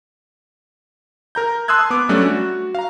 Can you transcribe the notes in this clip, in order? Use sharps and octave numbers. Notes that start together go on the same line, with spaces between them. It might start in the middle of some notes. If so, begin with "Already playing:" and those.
A#4 A#5 G6
A5 C6 D#6 E6 F#6 G#6
B3 D6
F#3 G3 A3 C#4 D4
F#4
F5 A#5